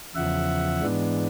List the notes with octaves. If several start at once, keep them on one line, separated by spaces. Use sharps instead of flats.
E2 C#3 F3 E5 F#5
G#2 E3 G#3 B3 D4